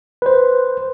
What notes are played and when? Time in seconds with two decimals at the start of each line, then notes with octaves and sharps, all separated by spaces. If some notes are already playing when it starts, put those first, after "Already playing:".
0.22 B4 C5